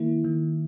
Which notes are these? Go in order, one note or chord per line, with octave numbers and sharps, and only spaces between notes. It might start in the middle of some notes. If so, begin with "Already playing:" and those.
Already playing: D#3 A#3 E4
D#3